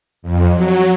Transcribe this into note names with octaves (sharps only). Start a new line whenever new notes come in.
F2
F#3